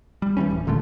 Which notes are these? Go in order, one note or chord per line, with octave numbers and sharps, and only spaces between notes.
G3
E3 F3 G3 C#4
D1
A#2 D3 G#3 A3